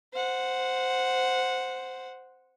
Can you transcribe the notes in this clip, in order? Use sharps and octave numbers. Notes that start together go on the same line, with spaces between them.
C5 F#5